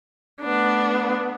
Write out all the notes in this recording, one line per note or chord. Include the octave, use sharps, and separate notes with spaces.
A3 B3 D4